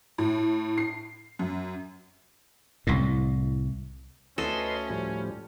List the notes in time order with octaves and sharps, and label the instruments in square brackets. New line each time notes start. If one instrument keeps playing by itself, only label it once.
[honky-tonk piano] A2
C7
F#2
[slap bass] C2 A2
[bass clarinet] D2 [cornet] C#4 [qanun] A4 [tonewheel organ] B4 D#5 C6
[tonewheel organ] A2 F3 G3